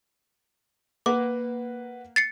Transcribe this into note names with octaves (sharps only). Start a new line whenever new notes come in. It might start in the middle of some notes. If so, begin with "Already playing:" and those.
A#3 B4 F#5 D6
A6 C7 C#7